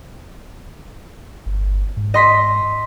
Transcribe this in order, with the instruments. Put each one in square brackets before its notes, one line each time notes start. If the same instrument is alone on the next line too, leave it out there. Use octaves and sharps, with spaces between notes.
[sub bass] G1
G#2
[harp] D#5 C6 B6